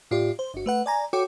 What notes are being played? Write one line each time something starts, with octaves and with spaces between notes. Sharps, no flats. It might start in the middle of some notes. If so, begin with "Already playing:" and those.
A2 F4 G4 D5
C5
G1 F#4
A3 B4 F#5
D5 G#5 A#5
F#4 A4 C#5 G5 D6